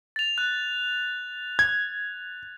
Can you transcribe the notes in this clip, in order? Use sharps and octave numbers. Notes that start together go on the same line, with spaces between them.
A6 F7
F#6
G#6